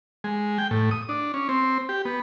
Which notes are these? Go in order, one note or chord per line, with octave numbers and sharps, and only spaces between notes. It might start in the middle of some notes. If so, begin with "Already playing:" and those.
G#3
G5
A2
D#6
D4
C#4
C4
G4
B3